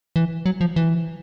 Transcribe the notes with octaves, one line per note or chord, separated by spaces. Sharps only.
E3
F#3
F3
E3